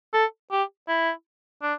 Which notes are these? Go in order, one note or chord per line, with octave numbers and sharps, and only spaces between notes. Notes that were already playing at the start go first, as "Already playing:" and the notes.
A4
G4
E4
D4